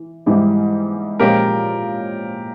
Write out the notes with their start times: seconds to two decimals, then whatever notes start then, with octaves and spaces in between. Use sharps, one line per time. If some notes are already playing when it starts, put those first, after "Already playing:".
Already playing: E3
0.26 G#2 E3 G3
1.20 A#2 F3 G#3 C#4 F4 G4 A#4